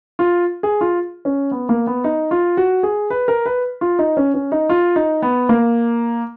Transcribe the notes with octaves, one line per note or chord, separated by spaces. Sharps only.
F4
G#4
F4
C#4
B3
A#3
B3
D#4
F4
F#4
G#4
B4
A#4
B4
F4
D#4
C#4
C#4
D#4
F4
D#4
B3
A#3